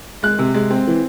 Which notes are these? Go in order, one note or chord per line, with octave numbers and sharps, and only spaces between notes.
G#3 F#6
C3
G#3
C4
E3